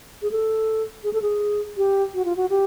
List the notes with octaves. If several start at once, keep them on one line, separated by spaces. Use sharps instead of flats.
G#4
A4
G#4
A4
G#4
G4
F#4
F4
F#4
G4